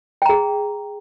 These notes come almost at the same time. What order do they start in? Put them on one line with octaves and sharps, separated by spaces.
G5 A#5 G#4